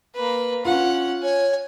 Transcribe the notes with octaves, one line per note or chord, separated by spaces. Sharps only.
A#3 B4
C#4 F4 F#5
C#5 G#5